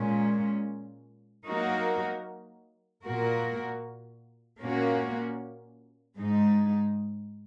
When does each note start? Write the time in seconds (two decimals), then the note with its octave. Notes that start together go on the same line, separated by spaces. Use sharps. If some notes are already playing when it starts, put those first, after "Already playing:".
Already playing: A#2 G#3 C#4
1.46 F#3 A#3 D#4 F#4 A#4
3.03 A#2 A#3 F#4 A#4
4.60 A#2 A#3 C#4 F#4
6.16 G#2 G#3 D#4